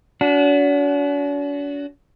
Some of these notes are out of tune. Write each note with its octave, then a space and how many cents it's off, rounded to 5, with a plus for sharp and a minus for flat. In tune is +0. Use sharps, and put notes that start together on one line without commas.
D4 -45 F#4 +0